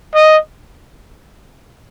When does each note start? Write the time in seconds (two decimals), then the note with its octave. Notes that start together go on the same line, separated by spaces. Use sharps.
0.14 D#5